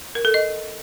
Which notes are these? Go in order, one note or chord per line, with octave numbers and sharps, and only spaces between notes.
A#4
A4
D#5